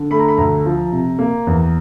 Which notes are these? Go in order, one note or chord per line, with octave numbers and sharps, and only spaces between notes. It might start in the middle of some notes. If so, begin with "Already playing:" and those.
Already playing: D3
A3 B5
A#5
B5
D2 A#5
F3
C3
A#3
E2